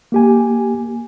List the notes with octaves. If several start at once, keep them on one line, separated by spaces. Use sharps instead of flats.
A#3 G4 G#5